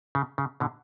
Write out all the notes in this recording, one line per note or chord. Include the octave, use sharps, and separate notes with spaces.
C#3
C#3
B2 D3